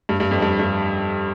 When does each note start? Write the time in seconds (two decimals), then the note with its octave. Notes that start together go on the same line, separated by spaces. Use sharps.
0.09 G2
0.20 G2
0.31 F2
0.42 G2
0.59 G2